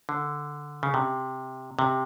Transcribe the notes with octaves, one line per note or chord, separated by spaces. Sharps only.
D3
C#3
C3
C3